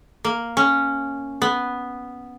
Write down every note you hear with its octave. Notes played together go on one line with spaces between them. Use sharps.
A#3
C#4
B3